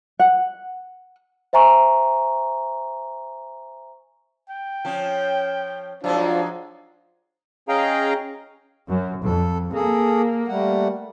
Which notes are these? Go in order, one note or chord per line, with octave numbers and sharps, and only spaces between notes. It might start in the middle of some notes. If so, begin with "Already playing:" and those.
F#5
C5 E5 G#5 A#5 C#6
G5
F3 C#4
F3 F#3 G#3 D4 D#4
C#4 G#4 D#5 F5 G5 A#5
F#2
F2 A4
A#3 G#4 A4
G3 A3 F#5